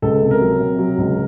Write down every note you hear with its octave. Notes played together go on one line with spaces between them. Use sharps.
C#2 A4
C3
A#4
F#3
C3
F#3
C#2